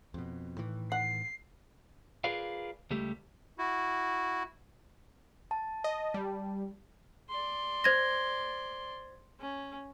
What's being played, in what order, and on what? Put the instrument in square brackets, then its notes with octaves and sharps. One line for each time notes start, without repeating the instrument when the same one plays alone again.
[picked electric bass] F2 B2
A2 D#3 E3
[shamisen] F#5 [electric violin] C7
[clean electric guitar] F4 G#4 A#4 B4 D5 F5
C#2 G3 A3 G4
[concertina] E4 F#4
[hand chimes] A5
[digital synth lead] D#5
G3
[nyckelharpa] D5 C6
[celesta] C5 G#6 A#6
[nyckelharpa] C#4